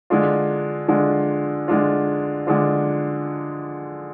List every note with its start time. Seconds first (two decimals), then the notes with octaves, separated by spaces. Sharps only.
0.10 D3 G#3 D4 F4
0.88 D3 G#3 D4 F4
1.68 D3 G#3 D4 F4
2.47 D3 G#3 D4 F4